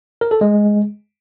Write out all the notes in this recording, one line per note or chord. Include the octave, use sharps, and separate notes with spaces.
A#4
A4
G#3